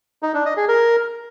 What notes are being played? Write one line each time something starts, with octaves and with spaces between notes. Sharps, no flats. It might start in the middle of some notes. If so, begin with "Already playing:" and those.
D#4
D4
D#5
G#4
A#4